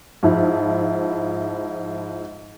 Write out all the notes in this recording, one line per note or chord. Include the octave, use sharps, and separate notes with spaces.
G#2 F3 E4